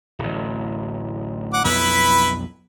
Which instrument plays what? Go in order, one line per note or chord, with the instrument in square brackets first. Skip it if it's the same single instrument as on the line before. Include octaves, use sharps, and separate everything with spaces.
[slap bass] D1 A1
[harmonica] F#5 D6
[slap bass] B1 F2 B3 [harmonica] E4 B4 B5